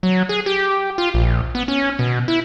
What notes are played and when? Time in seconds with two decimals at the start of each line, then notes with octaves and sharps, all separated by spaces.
0.03 F#3
0.29 G#4
0.46 G4
0.98 F4
1.14 A#1
1.55 B3
1.68 C#4
1.99 B2
2.28 E4